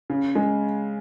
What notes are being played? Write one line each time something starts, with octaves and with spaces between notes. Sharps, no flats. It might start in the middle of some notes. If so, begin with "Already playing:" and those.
C#3
G#3